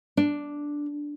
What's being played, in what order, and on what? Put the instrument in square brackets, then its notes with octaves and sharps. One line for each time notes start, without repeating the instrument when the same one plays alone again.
[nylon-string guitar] D4